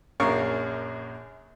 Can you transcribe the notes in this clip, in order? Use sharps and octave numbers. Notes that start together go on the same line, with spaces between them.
A#1 F#2 A#4 C#5 F5 C#6